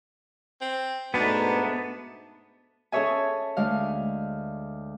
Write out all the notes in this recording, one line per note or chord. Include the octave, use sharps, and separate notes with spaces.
C4
G#2 B2 A3 B3 D4 D#4
C#4 G#4 A4 C#5 E5 G#5
D2 G#3 F5